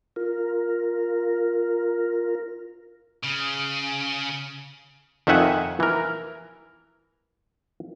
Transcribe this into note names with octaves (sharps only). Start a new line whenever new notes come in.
F4 A#4
C#3
F2 D#3 D#4 E5 F#5 G#5
E3 A#4